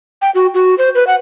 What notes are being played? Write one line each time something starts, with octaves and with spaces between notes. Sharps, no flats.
G5
F#4
F#4
C5
B4
F#5